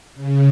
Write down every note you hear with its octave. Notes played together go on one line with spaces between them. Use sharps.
C#3